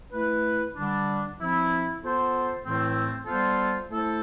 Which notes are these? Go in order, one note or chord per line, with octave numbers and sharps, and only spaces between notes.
A3 E4 B4
D3 G3 D4
F3 C4 E4
B3 F4 A4 C5
A2 E3 A3 C4
G3 B3 F4 A4 C5
A3 E4 A4 C5